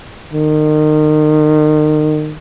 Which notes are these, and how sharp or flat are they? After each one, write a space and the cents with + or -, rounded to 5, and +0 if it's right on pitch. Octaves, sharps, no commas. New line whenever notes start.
D#3 -30